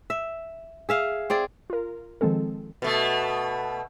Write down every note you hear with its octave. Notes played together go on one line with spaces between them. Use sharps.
E5
G#4 E5 F5
C4 G#4 D5
F4 A#4
D#3 F3 G#3 C4 A4
B2 A3